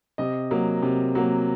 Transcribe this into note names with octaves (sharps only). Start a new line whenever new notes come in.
C3 D#5
F#3 A#3
C3
F#3 A#3